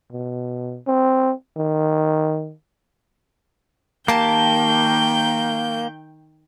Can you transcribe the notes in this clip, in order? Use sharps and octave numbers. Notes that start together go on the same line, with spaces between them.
B2
C4
D#3
D#3 A#3 G4 G5 A5 G6